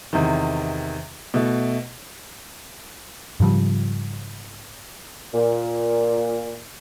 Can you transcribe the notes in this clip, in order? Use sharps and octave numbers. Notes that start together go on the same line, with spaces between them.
E2 C3 D#3
B2 A3 E4
G#2 C#3 F3 G3
A#2